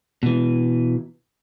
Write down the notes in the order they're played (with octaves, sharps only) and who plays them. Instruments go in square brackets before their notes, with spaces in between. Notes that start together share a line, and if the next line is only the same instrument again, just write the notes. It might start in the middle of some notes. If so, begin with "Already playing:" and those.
[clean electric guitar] B2 E3